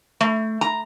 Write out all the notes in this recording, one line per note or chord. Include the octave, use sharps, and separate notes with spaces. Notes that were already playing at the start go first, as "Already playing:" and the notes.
A3
A#5